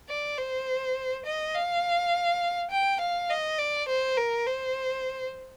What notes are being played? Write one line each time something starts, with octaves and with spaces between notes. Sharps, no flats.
D5
C5
D#5
F5
G5
F5
D#5
D5
C5
A#4
C5